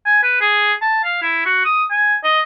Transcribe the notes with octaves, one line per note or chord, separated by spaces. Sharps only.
G#5
B4
G#4
A5
F5
E4
F#4
D#6
G#5
D#5